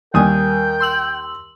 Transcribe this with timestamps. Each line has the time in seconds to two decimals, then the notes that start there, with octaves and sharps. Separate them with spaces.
0.14 D#2 G3 A#4 G5 G#5 D#6
0.80 C6 E6 F#7